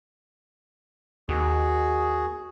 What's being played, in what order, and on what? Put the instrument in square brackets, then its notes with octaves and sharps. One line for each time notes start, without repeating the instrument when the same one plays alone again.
[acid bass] D#2 [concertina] F#4 G#4